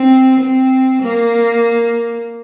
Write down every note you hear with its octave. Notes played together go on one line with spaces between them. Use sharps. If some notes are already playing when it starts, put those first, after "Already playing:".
Already playing: C4
C4
A#3